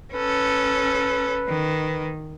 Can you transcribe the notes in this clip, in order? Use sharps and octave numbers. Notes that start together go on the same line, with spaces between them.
C#4 A4 B4
D#3